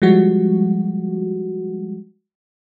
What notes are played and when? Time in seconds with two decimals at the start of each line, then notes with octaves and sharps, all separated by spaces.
0.02 F3 G3 G#3 F#4